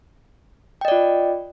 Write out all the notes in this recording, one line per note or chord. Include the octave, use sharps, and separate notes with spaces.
F4 D5 D#5 G5